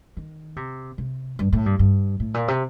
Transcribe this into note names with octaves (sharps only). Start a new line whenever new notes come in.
D#3
C3
C3
G2
A2
G2
G2
A2
A#2
C3